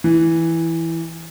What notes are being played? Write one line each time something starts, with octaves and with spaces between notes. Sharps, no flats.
E3